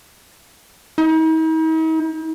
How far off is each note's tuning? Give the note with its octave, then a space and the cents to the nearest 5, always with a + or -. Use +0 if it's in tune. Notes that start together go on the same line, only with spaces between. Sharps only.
D#4 +45